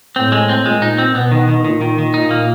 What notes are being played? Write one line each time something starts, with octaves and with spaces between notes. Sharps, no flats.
A2 C4
G#3
C4
A#2 G#3
D#4
C4
B2 B3
D#3
D#3
A#2 D#3
D#3
D#3
A#2 D#4
A#3